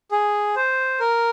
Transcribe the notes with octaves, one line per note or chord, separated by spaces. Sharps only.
G#4
C5
A#4